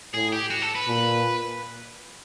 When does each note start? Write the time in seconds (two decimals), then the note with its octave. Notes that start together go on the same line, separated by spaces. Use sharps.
0.13 A2 G#4
0.33 G4
0.50 F#4
0.62 A4
0.75 B4
0.87 A#2